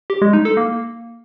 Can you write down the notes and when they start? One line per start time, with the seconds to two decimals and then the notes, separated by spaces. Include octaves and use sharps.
0.10 G4
0.22 G#3
0.33 D#4
0.45 A4
0.57 A#3